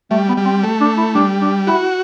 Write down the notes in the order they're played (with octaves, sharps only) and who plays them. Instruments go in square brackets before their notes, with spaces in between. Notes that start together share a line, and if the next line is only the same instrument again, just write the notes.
[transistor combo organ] G3 [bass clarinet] A3
[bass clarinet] B3
[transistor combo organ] G3
[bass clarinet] C4
[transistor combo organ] A3
[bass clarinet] D4
E4
[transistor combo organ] G3 [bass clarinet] D4
[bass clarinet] D4
[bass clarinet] E4 [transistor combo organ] F#4